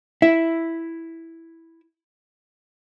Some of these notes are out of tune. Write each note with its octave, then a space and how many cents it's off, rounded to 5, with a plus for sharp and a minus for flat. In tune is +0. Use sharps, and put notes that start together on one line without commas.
E4 +0 E5 +0